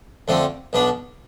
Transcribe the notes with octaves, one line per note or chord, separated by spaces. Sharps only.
F2 D3 A3 C4
B1 B2 B3 D4